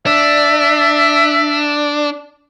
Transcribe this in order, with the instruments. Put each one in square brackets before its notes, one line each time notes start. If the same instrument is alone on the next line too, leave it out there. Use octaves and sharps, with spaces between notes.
[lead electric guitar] D4 [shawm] E5